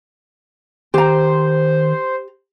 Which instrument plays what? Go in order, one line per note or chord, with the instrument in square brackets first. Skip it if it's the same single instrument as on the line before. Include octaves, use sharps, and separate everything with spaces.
[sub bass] D#3 [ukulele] G4 A#5 [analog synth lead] C5